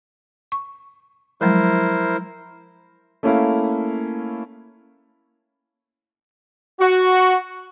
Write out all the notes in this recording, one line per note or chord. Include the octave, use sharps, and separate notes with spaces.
C#6
F3 F#3 G#3 E4 A#4 C5
A3 A#3 C#4 E4 F5
F#4